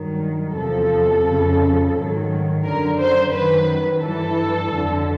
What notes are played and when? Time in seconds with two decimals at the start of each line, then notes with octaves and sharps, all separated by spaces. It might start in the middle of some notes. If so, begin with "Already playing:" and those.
Already playing: G2 D#3 F#3
0.56 E2 C3 F3 A4
1.25 F2 C#3 F3
1.95 G#2 D#3 F#3
2.64 F#2 D3 F#3 A#4
2.99 C5
3.33 F#2 D#3 F#3 B4
4.04 G2 E3 A4
4.73 F2 D3 F#3